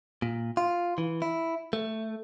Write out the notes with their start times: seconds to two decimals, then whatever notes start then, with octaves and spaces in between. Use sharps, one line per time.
0.22 A#2
0.57 F4
0.98 E3
1.22 E4
1.73 A3